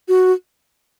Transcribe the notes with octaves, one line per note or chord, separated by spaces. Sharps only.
F#4